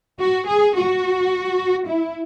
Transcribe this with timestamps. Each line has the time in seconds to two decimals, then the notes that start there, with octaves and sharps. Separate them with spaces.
0.20 F#4
0.47 G#4
0.75 F#4
1.88 E4